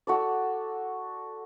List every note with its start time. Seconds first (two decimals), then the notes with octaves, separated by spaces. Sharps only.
0.07 F#4 A4 D5